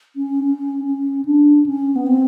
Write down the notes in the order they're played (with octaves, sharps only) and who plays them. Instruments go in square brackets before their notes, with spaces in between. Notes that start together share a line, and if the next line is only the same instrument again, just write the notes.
[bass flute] C#4
C#4
C#4
D4
C#4
B3
C4